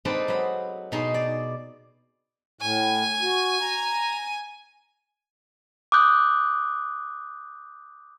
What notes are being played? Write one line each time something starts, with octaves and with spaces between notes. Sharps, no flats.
G#3 C4 D#4 A4 B4 D5
F#3 D#4 B5
B2 D#4 G#4 C6
D5
A2 G#5
F#4
A#5
D6 D#6 F#6 G6